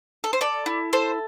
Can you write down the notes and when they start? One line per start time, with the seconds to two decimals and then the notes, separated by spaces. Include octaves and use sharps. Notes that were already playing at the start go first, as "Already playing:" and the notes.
0.24 A4
0.33 C5
0.41 A4 D5
0.66 E4
0.93 A4 C5